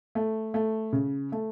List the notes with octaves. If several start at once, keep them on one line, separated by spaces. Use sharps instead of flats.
A3
A3
C#3
A3